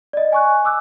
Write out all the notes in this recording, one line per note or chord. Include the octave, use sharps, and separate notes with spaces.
D5 D#5
G#5 C#6 F#6
D6 E6 F#6